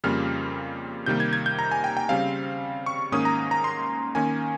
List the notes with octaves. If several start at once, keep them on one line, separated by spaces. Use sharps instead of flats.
F2 C#3 G3 A#3 F4 F6
C3 D#3 G3 A#3 G6
G#6
G#6
G6
A#5
G#5
G5
G5
C#3 G3 C4 F5
C#6
G#2 D#3 A#3 C#4 D#6
A#5
A#5
C6
D#3 A#3 C#4 G#5